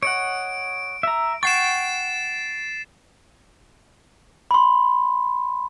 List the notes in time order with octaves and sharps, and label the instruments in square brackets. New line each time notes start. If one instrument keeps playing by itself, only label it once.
[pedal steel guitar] C#5 D#5 F#5 [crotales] D7
[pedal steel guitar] E5 A#5
[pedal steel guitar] F#5 G5 C#6 [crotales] A6 C7 E7
[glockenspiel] B5 C6